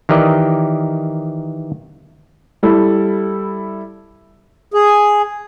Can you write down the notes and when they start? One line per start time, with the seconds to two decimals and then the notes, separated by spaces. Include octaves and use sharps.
0.09 D#3 E3 G4 A#4 D5 D#5
2.63 G3 E4 A4
4.74 G#4